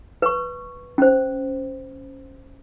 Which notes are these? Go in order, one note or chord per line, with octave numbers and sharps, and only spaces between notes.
B4 C#6
C#4 C5